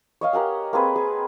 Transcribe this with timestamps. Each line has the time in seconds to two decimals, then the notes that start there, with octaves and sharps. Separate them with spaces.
0.21 C#5 D#5 F5 D#6
0.33 G4 A#4 F#5 G#5
0.73 A#3 C4 G#4 B4
0.96 G#4